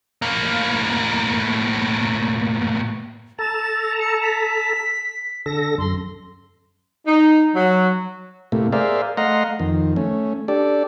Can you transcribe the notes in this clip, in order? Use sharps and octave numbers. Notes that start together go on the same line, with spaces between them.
A2 A#3
A4 A5 A#5 A6
C#7
B6
D3 A4 A#6
F#2 C6
D#4
F#3
A2 C3 A3 A#3
G#4 A#4 C5 D5 E5 F5
A3 D#5 F5 F#5 A#5 C6
F2 D#3
A3 C#4
D4 G4 A4 D5